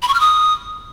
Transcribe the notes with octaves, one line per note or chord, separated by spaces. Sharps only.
B5
C#6
F6
D#6